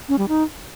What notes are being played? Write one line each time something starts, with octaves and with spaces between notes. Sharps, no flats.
C#4
G3
D#4